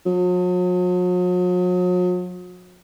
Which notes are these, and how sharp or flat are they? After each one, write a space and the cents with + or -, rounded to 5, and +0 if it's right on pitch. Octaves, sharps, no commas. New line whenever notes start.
F#3 -45